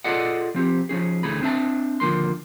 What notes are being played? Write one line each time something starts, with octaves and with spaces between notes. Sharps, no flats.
F4 G#4 A4 D5 D#5 F#5
F3 C4 G4
F3 C#4 G#4
D2 D3 E3 A3 G#4 B5
C4 D4 E5 A5
D#2 D3 F3 A#3 C6